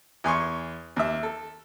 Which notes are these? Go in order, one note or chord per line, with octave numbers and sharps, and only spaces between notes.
E2 G#5 C6 C#6
D#2 E5
A4